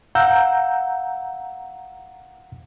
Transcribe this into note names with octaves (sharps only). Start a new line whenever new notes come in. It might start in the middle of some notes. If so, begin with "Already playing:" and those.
F5 F#5 A#5 E6 G6